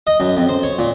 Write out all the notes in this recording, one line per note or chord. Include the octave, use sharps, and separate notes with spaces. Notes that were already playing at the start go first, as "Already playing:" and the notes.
D#5
F#2
F2
C5
C#5
A#2